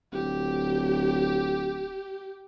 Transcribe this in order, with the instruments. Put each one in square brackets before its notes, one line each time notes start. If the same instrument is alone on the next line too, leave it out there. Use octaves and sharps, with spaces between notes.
[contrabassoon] D1 [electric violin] G4